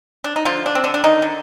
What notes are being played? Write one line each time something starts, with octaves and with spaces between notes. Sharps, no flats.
D4
D#4
D3 F3 F4
D4
C4
D3 D4
D4
D#3 D#4
D3